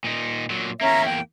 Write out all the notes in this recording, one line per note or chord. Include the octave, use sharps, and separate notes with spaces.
A#2 D#4
A#2 F#3
E2 A#3 C#4 E5 A#5
G5